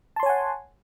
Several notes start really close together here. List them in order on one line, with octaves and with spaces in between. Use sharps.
A5 C6 C#5 G#5 F#5